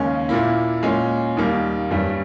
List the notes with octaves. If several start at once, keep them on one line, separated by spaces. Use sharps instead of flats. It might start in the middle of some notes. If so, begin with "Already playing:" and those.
Already playing: D#2 C#3 G#3 C#4
A#2 A#3 E4
A#2 G#3 C#4
D#2 D#3 G3 A#3
G2 G3 C#4